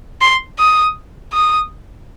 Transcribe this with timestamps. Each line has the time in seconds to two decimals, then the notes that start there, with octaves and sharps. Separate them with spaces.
0.21 C6
0.59 D#6
1.33 D#6